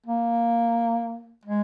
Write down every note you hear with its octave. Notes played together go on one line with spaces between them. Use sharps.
A#3
G#3